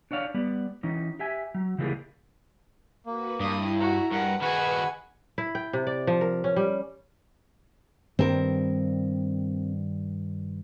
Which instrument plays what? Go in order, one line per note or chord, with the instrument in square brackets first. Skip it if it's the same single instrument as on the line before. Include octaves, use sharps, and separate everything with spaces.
[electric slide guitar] D4 C#5 D5 F5
G3 B3 D5
E3 C#4 D#4
G4 E5 G#5
F#3
C#3 E3 G3 A#3 F4 G#4
[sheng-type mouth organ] A#3 [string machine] F#4 B4
[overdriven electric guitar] G2 [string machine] E4 [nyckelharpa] D#6
[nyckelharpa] F#4 [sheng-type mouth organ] A#5
[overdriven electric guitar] G2 [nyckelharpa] A#4 F#5 [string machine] B4
[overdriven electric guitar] D#3 F#4 [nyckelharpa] G#4 G#5 [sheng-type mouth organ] F#5 B5
[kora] E4
G5
C3
D5
F3
A#4
C#4
G3
[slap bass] G2 D#3 G3 [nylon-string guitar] C4 A#4